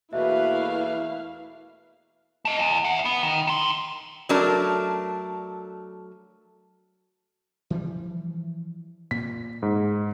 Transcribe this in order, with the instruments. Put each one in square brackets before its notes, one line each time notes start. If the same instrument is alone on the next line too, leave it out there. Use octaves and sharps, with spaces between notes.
[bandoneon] E2 A3 A#3 [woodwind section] B2 B4 [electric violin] E4 F5 [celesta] E5
[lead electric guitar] A3 D#5
E2
E5 F#5
B3
D#3
D#3 C6
[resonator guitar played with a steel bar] F#3 A3 D4 A#4
[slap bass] E3 F3 G3
[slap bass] A#2 [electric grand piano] B6
[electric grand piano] G#2